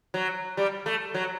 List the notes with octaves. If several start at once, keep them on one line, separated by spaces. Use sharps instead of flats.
F#3
G3
A3
F#3